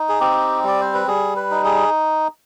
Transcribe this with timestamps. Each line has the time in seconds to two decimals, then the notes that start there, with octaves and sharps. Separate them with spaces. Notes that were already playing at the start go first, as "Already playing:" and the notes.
Already playing: D#4
0.09 G#4
0.20 C4 G4
0.63 G3 D5
0.81 C5
0.94 B4
1.08 G3 G#4
1.36 B4
1.51 D#4
1.65 G#4